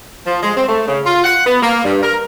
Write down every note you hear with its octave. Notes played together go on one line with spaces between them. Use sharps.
F3
G#3
C4
A3
C#3
F4
F#5
B3
A#3
G2
A#4